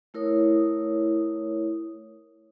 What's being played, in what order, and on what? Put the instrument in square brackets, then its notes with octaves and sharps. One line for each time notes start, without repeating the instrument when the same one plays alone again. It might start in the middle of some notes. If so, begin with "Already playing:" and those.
[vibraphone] A3 E4 A#4 C#5 D#6